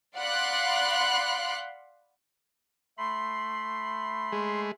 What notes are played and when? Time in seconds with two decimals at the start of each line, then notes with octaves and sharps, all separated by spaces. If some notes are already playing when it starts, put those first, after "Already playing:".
0.17 D5 F5 F#5 B5 C6 F#6
2.97 A3 B5 C6
4.32 G#3